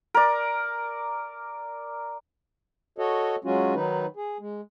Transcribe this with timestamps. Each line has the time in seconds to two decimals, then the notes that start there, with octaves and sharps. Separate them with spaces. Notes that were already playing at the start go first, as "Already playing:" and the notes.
0.14 A#4 D5
2.98 F#4 A4 C#5 D#5
3.44 F#3 G#3 C#4 F4 F#4
3.75 D#3 F#3 D#4 B4
4.16 G#4
4.39 G#3